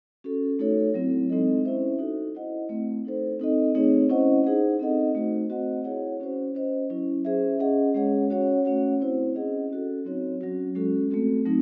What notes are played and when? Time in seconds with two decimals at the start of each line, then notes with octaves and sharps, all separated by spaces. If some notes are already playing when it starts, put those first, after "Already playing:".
0.24 C#4 F#4 A4
0.59 A3 D#4 F#4 A4 C#5
0.94 F#3 C4 E4
1.30 G#3 C4 D#4 A4 D#5
1.65 C#4 E4 C5 E5
1.99 D#4 F#4 A4
2.35 E4 C5 D#5 F#5
2.69 A3 C4 E4
3.05 D#4 A4 C5
3.39 C4 D#4 A4 D#5
3.75 A3 C4 D#4 G#4 C#5
4.09 C#4 E4 C5 D#5 F#5
4.44 D#4 G#4 C5 F#5
4.79 C4 D#4 A4 D#5 F#5
5.15 A3 D#4 F#4 C5
5.50 C4 F#4 C5 D#5 F#5
5.84 E4 G#4 C#5 F#5
6.20 C#4 F#4 C5
6.55 C#4 F#4 C5 D#5
6.90 F#3 C#4 E4
7.25 C#4 G#4 C5 E5
7.59 C#4 G#4 D#5 F#5
7.94 G#3 C#4 G#4 C#5 F#5
8.30 C#4 F#4 C#5 F#5
8.65 A3 C#4 F#4 C#5 F#5
9.00 C4 E4 C5
9.35 C#4 G#4 D#5 F#5
9.70 C#4 F#4 A4
10.05 F#3 C4 D#4 F#4 C#5
10.41 F#3 C#4 F#4
10.75 G#3 C#4 F#4 A4
11.11 A3 C4 F#4 A4
11.45 F#3 A3 C4 D#4